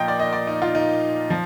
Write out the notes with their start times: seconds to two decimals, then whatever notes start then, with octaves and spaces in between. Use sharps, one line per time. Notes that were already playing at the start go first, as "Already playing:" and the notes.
Already playing: A#2 F3 D#5 F5 G5
0.08 D5
0.20 D#5
0.33 D5
0.47 D#4
0.62 F4
0.75 D#4
1.30 F3